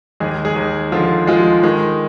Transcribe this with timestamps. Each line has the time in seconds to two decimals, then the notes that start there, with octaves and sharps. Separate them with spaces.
0.20 D#2 G#3 G#4
0.45 G#3 G#4
0.56 D#2
0.92 D3 F3 F4
1.27 F3 G#3 F4
1.63 D#3 G#3 D#4